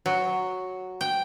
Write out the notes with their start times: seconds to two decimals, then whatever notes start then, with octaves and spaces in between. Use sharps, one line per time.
0.06 F#3
1.01 G5